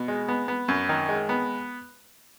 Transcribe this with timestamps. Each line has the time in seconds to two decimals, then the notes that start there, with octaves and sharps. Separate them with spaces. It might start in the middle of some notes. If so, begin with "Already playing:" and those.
Already playing: B2
0.08 G#3
0.28 B3
0.48 B3
0.68 F#2
0.89 D#3
1.09 G#3
1.29 B3